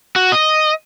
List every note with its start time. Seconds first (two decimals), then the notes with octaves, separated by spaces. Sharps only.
0.16 F#4
0.32 D#5